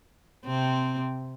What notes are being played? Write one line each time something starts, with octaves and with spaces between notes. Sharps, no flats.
C3 C4